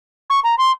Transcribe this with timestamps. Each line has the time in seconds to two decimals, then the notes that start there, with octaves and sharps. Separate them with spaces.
0.30 C#6
0.44 A#5
0.58 C6